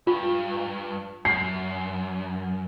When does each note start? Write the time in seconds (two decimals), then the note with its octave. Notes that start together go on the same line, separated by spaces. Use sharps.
0.07 D2 G2 F4
1.25 F#2 C7